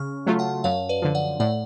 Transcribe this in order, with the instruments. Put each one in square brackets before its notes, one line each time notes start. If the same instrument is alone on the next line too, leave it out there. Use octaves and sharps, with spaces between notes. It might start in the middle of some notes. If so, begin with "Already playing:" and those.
Already playing: [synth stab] C#3 [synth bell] C#6 F6
[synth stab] F#3 A3 F4
[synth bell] F#5 A5
[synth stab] F#2 [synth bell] C#5 F5
[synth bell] B4 D5
[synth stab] D3 F3
[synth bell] D5 F#5
[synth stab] A2 [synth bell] D5 F#5